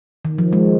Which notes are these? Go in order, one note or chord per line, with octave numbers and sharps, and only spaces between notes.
D#3
F3
G#3